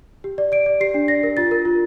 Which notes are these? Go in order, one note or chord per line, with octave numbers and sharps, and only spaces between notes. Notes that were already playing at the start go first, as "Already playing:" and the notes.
G4
D5
D5 D7
D5
G4 C7
D4
D5 A#6
A#4
F4 A6
A#4
F4